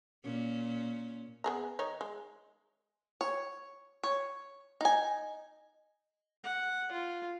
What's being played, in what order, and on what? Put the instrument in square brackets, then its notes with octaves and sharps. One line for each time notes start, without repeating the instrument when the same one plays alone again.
[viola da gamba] A#2 C#4
[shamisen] B3 G#4 A#5
D#3 D#4 C#5
G#3
[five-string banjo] C#5
C#5
D#4 G#5
[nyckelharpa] F#5
F4